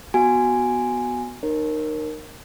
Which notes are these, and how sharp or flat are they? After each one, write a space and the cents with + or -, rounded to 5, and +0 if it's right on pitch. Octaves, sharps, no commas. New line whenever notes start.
B3 +0 F#4 +0 G#5 +0
D#4 -30 A#4 +0 C#5 -45